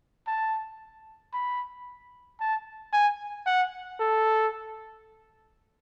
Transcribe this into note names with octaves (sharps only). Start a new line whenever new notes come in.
A5
B5
A5
G#5
F#5
A4